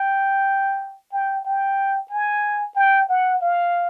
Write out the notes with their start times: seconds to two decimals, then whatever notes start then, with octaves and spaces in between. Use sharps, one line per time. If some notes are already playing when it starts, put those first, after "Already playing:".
Already playing: G5
1.12 G5
1.45 G5
2.10 G#5
2.75 G5
3.09 F#5
3.41 F5